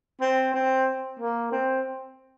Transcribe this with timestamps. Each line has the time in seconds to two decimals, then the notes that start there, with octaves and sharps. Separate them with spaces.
0.21 C4
0.54 C4
1.20 A#3
1.52 C4